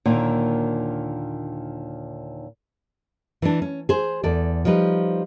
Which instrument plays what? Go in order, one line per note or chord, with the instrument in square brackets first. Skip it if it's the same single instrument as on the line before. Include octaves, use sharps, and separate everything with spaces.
[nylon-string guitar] D#2 A#2 D3 D#3
E3 D4
C#4
G#4 C5
E2 A4 D5
F3 G3 D#4 B4